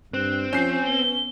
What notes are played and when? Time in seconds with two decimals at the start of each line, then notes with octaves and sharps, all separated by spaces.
0.14 G2 C4 F#6
0.53 F3 C#4 G6 C7
0.86 B3 G7